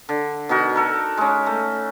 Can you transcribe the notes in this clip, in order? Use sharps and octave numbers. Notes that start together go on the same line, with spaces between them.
D3
B2 D#4 F#4 A#4
A4 A#4
G#3 C#4
A3